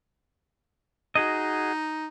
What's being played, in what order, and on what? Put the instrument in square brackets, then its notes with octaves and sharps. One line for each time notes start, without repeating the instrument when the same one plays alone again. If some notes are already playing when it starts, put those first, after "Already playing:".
[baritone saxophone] D#4 [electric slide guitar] F#4 G#4 D#5